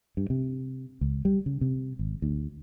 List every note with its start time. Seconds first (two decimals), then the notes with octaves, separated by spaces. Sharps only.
0.17 G2
0.30 C3
1.01 C#2
1.25 G3
1.46 C#3
1.61 C3
1.99 G#1
2.22 D2